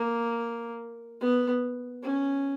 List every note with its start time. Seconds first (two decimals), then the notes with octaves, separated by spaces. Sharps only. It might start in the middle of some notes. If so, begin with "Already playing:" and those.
Already playing: A#3
1.21 B3
2.03 C#4